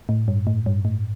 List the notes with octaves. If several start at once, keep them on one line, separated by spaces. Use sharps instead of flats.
A2
G2
A2
G2
A2